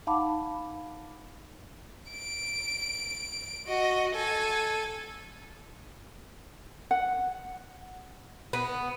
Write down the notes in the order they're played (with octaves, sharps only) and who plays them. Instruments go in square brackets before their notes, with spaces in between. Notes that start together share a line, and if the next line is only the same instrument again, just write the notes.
[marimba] D#4 F5 F#5 A5 B5 D6
[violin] D7
F#4 D#5
A4 G#5
[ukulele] F#5
[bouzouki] B3